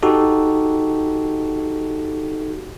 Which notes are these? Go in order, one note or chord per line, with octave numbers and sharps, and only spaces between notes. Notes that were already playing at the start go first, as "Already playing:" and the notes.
D#4 F#4 G4 A4